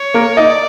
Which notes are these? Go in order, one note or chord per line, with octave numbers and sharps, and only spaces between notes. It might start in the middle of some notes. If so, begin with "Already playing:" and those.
Already playing: C#5
A#3 A#4
D#4 D5 D#5